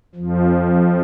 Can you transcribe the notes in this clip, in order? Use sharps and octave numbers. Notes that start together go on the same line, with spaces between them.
F2 F3